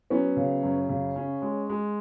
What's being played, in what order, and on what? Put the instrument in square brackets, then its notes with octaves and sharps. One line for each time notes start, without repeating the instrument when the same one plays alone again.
[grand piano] F#3 [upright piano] B3 C#4
[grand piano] C#3
F#2
C#3
C#4
G#3
G#3